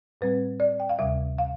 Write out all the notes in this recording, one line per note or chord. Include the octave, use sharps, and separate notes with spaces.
A2 G3 C4 B4
D5
G5
F5
D2 C3 G3 E5
F5